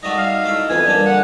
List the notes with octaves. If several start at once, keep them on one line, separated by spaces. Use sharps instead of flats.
G3 A3 D#4 F#4 D#5
F5
A3 E4
F2 E3 B3 G#5
G3 A#3 D4
D3 F#5